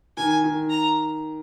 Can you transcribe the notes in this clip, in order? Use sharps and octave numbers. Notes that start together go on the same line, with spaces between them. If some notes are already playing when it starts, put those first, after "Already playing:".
D#3 G#5
D#3
A#5